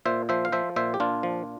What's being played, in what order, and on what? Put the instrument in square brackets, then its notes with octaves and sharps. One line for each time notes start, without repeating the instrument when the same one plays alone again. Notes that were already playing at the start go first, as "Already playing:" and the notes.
[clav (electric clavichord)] A#2 C5 E5
F3 C5 E5
F5
F3 C5 E5
A#2 C5 E5
G4
A#2 D4 F4
F3